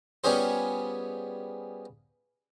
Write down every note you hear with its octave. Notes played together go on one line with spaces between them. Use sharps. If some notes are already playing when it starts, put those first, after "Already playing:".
G3 B3 C#4 F4 G#4 C5